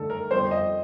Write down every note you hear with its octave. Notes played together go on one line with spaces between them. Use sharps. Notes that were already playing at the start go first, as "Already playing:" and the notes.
Already playing: D#2 D3 A3 D#4 A4
A#4
G1 F2 D3 C5
D#5